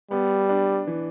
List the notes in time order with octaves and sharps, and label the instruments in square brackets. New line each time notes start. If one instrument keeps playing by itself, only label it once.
[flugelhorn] G3 [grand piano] B3
[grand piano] D4
E3